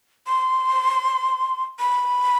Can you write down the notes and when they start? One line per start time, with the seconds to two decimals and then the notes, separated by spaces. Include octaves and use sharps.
0.27 C6
1.79 B5